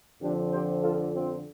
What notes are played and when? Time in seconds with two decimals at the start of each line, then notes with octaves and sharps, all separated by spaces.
0.20 F2 D3 F3 C4 D4 G4
0.51 G4 C5
0.82 F4 A4
1.12 C4 F4